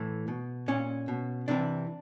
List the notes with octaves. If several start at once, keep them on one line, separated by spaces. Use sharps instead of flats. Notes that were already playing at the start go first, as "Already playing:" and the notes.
Already playing: A2 E3
B2
A#2 C#4
B2
C3 E3 D4